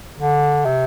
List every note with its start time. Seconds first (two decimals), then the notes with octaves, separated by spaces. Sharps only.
0.18 D3
0.65 C3